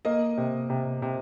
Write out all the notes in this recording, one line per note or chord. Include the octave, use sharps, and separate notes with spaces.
A#3 D#5
C3
C3
C3